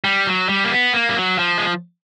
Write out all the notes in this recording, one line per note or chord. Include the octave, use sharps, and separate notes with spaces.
G3
F#3
G3
A#3
B3
A#3
G3
F#3
F3
G#3